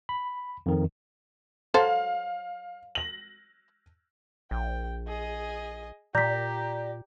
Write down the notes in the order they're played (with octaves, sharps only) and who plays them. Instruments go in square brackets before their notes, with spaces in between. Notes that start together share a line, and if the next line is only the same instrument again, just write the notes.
[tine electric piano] B5
F2 D#3
[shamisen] F#3 A4 C5 [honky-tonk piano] F5
[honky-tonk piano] A#6 F#7
[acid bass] A#1 [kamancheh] G5
[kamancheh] G#4 D#5
[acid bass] A#2 [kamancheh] G4 [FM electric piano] D5 A#5 [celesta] G6 B6